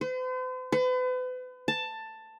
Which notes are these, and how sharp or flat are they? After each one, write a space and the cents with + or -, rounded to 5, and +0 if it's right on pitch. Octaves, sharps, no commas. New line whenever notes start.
C5 -45
B4 +40
A5 +10